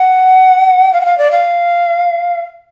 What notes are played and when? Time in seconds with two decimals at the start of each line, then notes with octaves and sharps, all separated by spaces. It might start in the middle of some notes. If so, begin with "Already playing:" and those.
Already playing: F#5
0.93 F5
1.01 F#5
1.05 F5
1.18 D5
1.31 F5